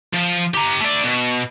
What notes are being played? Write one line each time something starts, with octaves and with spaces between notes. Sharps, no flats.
F3
G4 A#5
A3 D5
B2